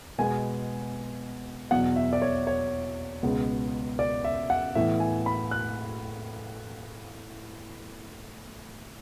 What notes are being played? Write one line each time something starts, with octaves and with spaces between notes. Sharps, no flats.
B2 G#3 B3 G#5
E2 B2 F#3 F#5
E5
D5
C#5
C#5
C#2 B2 G#3 B3
D5
E5
F#5
A2 E3 B3 E5
G#5
B5
F#6